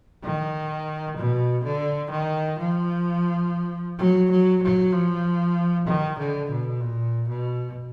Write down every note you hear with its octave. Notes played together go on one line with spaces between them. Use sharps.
D#3
B2
D3
D#3
F3
F#3
F#3
F#3
F3
D#3
D3
B2
A#2
B2